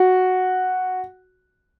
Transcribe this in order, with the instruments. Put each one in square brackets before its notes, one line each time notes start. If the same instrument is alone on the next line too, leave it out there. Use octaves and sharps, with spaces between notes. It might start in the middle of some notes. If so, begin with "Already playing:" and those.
Already playing: [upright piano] F#4